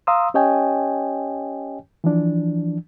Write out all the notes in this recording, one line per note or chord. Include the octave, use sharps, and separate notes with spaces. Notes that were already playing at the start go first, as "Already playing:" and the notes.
F5 A#5 C6 D#6 E6
C#4 G4 C#5 D#5 G5 G#5
E3 F3 D4